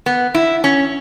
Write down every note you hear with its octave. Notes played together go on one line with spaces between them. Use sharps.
B3
E4
C#4